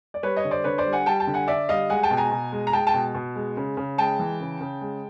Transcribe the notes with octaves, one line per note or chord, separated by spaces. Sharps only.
D5
G3 B4 C#5
C#5 D#5
D3
C5 D5
D3 B4 C#5
C5 D5
G3
F#5 G#5
G3 G5 A5
G5 A5
D3
F#5 G#5
D3 D5 E5
G3 D#5 F5
G#3 F#5 G#5
G5 A5
B2
G#5 A#5
B2
G#3
A#5
G#3 G5 A5
G5 A5
B2
B2
G#3
C#3
C#3
G#3 G5 A5
E3
C#3
C#3
G#3